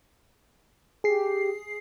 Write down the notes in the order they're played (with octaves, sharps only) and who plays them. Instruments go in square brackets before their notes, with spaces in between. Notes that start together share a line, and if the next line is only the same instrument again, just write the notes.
[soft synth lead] G4 [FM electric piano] G#4 C7